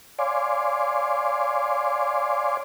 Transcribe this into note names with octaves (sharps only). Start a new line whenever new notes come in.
C#5 D5 F5 G#5 C6 D6